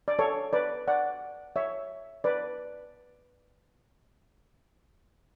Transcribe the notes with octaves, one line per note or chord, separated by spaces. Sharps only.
D5
A4 C#5
B4 D5
D5 F#5
C#5 E5
B4 D5